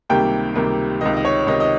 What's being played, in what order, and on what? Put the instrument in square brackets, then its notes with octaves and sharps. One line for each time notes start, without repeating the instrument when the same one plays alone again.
[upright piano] C#2 C3 D#3 G3 A#3 G5
C#2 C3 D#3 G3 A#3
C#2 C3 D#3 D#5
D#5
C#5
C#2 C3 D#3 D#5
D#5